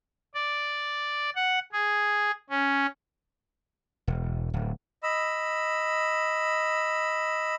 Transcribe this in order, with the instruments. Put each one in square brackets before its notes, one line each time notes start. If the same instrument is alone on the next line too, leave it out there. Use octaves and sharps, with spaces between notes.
[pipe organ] D5
F#5
G#4
C#4
[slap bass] E1
D1
[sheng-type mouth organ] D#5 B5 E6